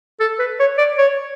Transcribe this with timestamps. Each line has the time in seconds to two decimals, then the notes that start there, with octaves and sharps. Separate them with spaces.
0.20 A4
0.39 B4
0.60 C#5
0.78 D5
0.98 C#5